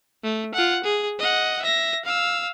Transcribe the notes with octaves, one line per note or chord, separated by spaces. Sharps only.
A3
F4 F#5
G#4
D#5 F#5
E5 A#6
F5 E6